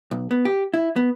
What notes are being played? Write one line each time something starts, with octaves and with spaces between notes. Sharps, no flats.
B1
B3
G4
E4
B3